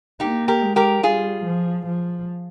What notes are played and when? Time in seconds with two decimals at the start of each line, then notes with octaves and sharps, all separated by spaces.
0.20 A#3 D#4 G4
0.48 G4 A#4
0.61 G#3
0.76 G4 A#4
1.03 G3 F4 G#4
1.45 F3
1.87 F3